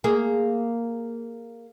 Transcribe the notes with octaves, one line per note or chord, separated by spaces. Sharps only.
A#3 G#4